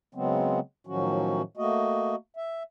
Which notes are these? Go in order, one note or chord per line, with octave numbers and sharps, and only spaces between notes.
C#3 F#3 G#3 B3 C4
A2 D#3 F3 F#3 C#4 F#4
A3 A#3 F#4 D#5
E5